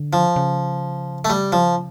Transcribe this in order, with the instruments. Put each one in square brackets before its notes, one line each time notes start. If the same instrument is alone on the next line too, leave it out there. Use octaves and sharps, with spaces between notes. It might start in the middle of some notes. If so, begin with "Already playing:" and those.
Already playing: [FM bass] D3
[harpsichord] F3
[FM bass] C#3
[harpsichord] A3
G3
F3